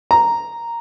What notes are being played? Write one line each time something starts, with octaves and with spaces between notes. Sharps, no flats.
A#5